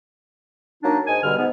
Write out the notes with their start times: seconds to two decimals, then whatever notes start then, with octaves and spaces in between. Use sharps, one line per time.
0.84 F#3 A#3 D4 D#4
1.07 G#2 D#5 G#5
1.24 G2 B2 D3 G3 F6
1.38 G#2 B3